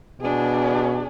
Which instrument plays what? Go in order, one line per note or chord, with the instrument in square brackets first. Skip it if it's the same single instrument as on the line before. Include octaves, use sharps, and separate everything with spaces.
[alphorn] B2 [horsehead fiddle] D4 G#4